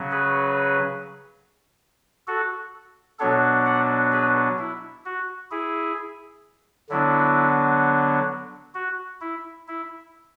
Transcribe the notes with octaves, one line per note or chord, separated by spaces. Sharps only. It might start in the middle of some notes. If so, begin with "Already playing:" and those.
Already playing: C#3 F#3 C#4
G#4 B4
F#4 A4
B2 F#3 B3 D4 A4 C#5
D5 F#5
G#4 B4
E4
F#4
E4 G#4
D3 F#3 B3 D4 E4
F#4
E4
E4